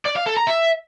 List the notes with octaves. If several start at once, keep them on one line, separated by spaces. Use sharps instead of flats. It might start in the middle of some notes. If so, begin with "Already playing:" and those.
D5
F5
A4
A#5
E5